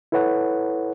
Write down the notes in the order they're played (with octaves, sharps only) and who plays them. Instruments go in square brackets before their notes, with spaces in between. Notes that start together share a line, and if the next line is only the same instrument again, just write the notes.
[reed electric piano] E4 A4 B4 C#5 F#5